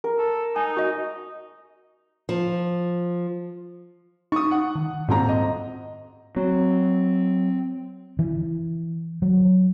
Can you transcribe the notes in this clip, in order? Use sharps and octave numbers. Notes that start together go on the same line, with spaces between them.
A#4
A4
D#4 G#5
F#4 D#5
F3
D#4 C#6 D#6
F#5
D#3
D#1 G#2 C4 A#5
D#5
F#3 C4
E3
F#3